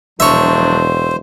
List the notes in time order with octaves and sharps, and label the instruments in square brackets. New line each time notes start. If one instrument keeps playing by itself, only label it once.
[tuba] E1 [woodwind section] F3 F#3 D4 [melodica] C5 [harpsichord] C#5 E5